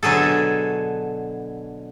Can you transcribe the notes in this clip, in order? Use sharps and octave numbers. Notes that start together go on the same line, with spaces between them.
B2 D3 F#3 G#4 A4